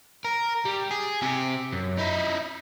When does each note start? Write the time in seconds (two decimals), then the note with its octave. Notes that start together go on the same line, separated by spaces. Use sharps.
0.25 A#4
0.65 G3
0.91 G#4
1.22 C3 G4
1.73 F#2
1.98 D#4 E4